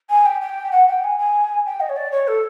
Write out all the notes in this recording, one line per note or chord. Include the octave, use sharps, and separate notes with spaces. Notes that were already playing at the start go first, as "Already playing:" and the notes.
G#5
G5
G5
F#5
G5
G#5
G#5
G5
D#5
C#5
D5
C#5
A4